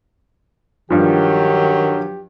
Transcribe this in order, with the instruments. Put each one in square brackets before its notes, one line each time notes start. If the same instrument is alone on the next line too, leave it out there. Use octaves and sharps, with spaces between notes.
[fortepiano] G2 F3 [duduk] D#3 [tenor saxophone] F#3 [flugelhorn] G4